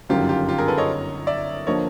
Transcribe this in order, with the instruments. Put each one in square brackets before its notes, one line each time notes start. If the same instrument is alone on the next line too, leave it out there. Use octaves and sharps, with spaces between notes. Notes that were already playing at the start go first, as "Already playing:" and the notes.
[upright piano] G1 F#2 D#3 [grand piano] F4 G4
[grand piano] F4 G4
F4 G4
G#4 A#4
A4 B4
C#5 D#5
D5 E5
[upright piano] D3 F3 A#3 [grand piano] C#5 D#5